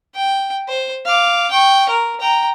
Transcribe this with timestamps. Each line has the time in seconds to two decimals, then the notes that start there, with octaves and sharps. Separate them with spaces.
0.15 G5
0.68 C5
1.06 F5 D6
1.51 G5 C#6
1.89 A#4
2.20 G5 A#5